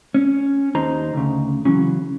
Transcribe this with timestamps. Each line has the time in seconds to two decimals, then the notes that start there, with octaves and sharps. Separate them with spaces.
0.14 C#4
0.75 D#2 D#4 C5 A#5
1.14 D2 C#3
1.65 C#3 E3 F#3 C#4